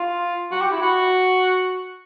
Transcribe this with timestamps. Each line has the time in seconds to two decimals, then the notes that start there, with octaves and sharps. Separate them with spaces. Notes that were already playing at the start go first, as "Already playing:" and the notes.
Already playing: F4
0.51 F#4
0.61 G4
0.72 E4
0.82 F#4